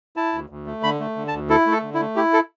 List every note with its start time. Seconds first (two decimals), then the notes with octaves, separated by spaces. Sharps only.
0.16 E4 A5
0.33 D2
0.50 D2
0.66 A3
0.83 D3 B5
1.00 A3
1.16 D3
1.28 A5
1.33 D2
1.49 E4 A4
1.66 A3
1.72 A4
1.83 D3
1.94 E4
2.00 A3
2.16 E4 G4
2.33 A4